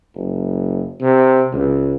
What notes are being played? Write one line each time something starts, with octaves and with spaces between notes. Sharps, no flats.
F#1
C3
C#2